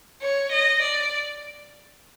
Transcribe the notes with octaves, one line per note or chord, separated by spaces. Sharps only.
C#5
D#5
D5